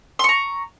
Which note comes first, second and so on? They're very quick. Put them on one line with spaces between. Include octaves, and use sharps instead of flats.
C6 C#6 A#5